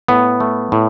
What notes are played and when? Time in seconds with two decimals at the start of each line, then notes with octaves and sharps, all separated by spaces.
0.08 A2 B3
0.40 A3
0.72 A2